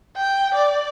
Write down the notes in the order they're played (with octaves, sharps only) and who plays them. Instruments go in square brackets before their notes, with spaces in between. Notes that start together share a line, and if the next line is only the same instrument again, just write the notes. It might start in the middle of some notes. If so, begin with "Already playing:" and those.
[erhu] G5
D5